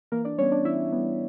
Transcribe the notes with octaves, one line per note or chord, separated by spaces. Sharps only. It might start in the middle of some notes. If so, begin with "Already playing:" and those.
E3 A#3 A#4
D4 D5
G3 B3 C#4 C#5
D4 D5
E3 E4 E5
G3 B3